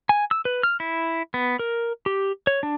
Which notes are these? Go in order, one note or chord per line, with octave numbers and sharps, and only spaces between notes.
G#5
E6
B4
F6
E4
B3
A#4
G4
C#5
D4